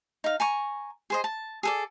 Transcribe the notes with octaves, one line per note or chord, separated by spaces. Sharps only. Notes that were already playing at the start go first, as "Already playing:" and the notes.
D#4 F5
G#5 A#5 C#6
G#4 C5 D#5
A5
G#4 A4 D5